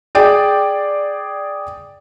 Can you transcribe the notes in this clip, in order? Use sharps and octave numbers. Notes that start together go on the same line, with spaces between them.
G#4 D5 G5